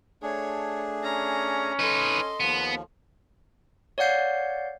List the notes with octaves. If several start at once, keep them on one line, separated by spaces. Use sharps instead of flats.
A3 D4 G#4 C#5
C#4 A#5
D#4 A4 B4 D#5 C6
D#2 F3 B3
C#5 D5 F5 F#5 G6 C7